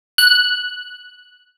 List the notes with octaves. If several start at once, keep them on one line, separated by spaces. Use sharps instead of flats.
F#6